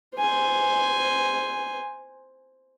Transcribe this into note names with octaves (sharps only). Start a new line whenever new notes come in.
C5 G#5